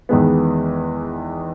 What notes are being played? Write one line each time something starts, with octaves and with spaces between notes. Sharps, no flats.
E2 D#3 G#3 B3